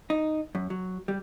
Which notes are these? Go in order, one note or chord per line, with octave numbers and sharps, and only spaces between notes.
D#4
F#2
F#3
G3